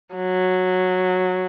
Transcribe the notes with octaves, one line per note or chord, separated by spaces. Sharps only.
F#3